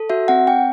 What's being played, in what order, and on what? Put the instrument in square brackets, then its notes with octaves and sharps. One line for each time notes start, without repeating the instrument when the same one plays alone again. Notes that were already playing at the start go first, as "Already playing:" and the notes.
Already playing: [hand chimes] A4
F#4 E5
C4 F#5
C4 G5